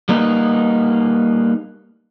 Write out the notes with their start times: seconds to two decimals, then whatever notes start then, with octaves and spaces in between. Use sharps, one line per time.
0.09 G3 A#3 B3 D#4